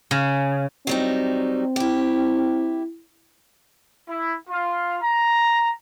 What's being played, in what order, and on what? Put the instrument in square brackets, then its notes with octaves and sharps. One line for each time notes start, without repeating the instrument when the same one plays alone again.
[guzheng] C#3
[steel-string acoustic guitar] F#3 G3 D#4 [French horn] C4
[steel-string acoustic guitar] E4 G4
[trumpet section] E4
F4
A#5